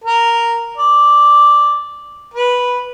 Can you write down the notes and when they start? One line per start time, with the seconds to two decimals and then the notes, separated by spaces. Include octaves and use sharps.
0.04 A#4
0.77 D5
2.34 B4